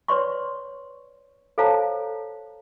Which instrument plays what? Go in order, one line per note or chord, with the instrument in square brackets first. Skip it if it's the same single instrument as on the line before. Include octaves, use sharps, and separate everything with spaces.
[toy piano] B4 C#5 D5 C6 C#6
A4 C5 C#5 F5 A5 A#5